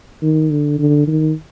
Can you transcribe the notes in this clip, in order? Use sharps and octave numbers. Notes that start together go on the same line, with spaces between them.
D#3
D3
D3
D#3